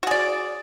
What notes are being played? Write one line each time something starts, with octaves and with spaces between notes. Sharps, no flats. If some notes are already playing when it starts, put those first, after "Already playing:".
F#4 G#4 D5